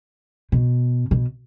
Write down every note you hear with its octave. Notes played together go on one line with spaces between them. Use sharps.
B2
B2